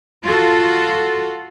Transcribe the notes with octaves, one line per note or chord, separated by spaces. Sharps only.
F4 F#4 A4